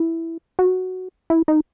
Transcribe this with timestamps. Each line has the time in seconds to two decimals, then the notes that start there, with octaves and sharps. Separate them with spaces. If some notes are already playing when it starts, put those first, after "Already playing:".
Already playing: E4
0.59 F#4
1.30 E4
1.48 D#4